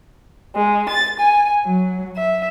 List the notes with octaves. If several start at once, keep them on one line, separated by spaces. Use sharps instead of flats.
G#3
A6
G#5
F#3
E5